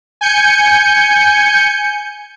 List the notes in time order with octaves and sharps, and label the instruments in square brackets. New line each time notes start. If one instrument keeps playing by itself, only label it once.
[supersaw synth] G#5 G6 C#7